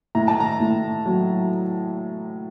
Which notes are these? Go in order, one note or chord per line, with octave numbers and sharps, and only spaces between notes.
A2 A#5
A5
A#5
A2
F#3